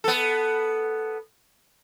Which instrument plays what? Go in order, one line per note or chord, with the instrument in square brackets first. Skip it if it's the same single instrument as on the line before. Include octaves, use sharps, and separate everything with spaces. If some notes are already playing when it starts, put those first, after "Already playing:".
[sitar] B3 A4